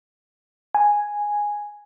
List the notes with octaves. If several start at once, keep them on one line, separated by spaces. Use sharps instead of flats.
G#5